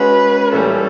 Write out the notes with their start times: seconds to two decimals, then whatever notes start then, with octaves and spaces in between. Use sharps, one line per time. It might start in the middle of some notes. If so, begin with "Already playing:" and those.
Already playing: G#3 C#4 F#4 B4
0.53 A2 E3 G3 A#3 C#4 A4